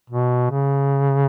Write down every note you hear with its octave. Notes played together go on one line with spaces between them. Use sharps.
B2
C#3